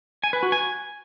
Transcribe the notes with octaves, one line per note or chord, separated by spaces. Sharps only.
G#5
B4
F#4
G#5